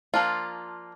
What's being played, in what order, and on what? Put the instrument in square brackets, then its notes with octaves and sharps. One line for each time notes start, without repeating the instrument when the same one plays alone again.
[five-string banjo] F3 A#3 D4 F4